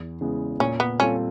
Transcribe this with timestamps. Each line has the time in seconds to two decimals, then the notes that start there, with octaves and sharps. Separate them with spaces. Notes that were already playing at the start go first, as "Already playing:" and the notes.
Already playing: E2
0.21 C#3 E3 G#3 B3
0.60 A#2 C#4
0.80 B3
1.00 G3 C4 C#4 F4 A4